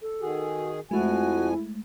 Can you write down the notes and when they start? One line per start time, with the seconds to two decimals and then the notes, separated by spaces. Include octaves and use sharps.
0.02 A4
0.21 D#3 F#4 G#4
0.91 F2 F3 G#3 A3 E4 F#4 G#5